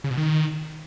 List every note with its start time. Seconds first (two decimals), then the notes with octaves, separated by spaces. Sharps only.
0.04 C#3
0.11 B2
0.17 D#3